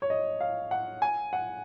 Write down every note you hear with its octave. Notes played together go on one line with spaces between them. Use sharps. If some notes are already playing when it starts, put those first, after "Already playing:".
C#5
D#5
F5
F#5
G#5
F#5